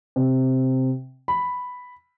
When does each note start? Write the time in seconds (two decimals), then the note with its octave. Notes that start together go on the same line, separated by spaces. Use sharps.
0.16 C3
1.28 B5